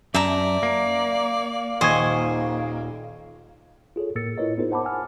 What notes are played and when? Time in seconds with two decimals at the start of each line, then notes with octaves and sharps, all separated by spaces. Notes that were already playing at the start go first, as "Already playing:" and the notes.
0.15 F#2 D5 E5 A5 A#5
0.63 A#3
1.81 D#1 C5 D#5 G#5 C#6 G#6
3.96 F4 G#4 A4 C#5
4.15 A2 A#3 A#4 E6 A6 C#7
4.38 E4 F4 A#4 B4 C#5 D#5
4.58 B3 D#4 F4 G#4 A#4 C5
4.71 C5 F#5 A5 B5 D6
4.85 F#5 G#5 A5 E6 F6